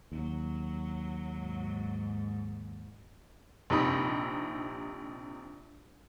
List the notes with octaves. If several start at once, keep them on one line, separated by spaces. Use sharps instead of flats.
D#2 F#3
G#2
A#1 C3 D#4 B5